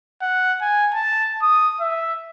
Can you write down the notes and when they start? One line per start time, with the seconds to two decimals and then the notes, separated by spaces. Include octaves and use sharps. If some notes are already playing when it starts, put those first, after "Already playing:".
0.21 F#5
0.61 G#5
0.94 A5
1.42 D#6
1.80 E5